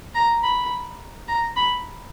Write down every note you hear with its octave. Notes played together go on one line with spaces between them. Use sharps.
A#5
B5
A#5
B5